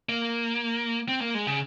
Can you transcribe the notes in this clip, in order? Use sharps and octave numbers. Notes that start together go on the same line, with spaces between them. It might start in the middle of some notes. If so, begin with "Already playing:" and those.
A#3
C4
A#3
G#3
C#3